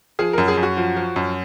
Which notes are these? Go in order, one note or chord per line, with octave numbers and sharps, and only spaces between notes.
F3 G#4
F#2 A#4
G#4
F#2
F#4
F3
F3
F#2